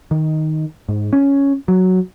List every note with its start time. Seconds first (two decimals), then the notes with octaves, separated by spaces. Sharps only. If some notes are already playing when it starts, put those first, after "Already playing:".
0.11 D#3
0.89 G#2
1.13 C#4
1.68 F#3